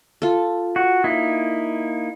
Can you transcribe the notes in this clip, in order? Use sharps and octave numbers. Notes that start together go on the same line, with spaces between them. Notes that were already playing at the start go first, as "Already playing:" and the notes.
F4 A4
F#4
A#3 D#4 E4